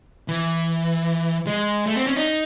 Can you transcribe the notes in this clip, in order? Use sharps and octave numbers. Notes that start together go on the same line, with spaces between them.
E3
G#3
A3
C4
C#4
D#4